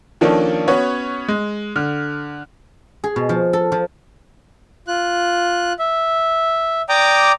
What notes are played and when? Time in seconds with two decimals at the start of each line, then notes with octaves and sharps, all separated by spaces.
0.21 D#3 F3 A#3 C#4 D4 A4
0.68 B3 C#4 F#4 C#5
1.28 G#3
1.76 D3 F6
3.04 G#4
3.16 B2
3.29 F3
3.53 A4
3.72 F3
4.88 F4 F#6
5.79 E5
6.89 D5 G5 A#5 D6 D#6